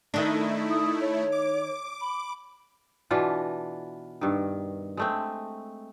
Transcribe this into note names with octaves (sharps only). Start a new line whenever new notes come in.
D#3 A3 D4 E4
D#6
C#5
D6
B5
B2 E3 D4 F4
G2 D#3
G#3 A3 C4